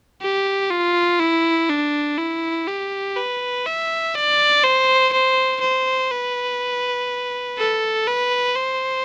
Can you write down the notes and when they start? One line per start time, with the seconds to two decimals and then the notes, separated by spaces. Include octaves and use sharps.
0.22 G4
0.71 F4
1.20 E4
1.70 D4
2.18 E4
2.67 G4
3.16 B4
3.66 E5
4.15 D5
4.63 C5
5.13 C5
5.61 C5
6.11 B4
7.59 A4
8.07 B4
8.56 C5